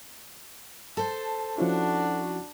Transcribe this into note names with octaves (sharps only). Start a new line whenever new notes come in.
A4 C5 A5
F3 C#4 D4 E4 F#4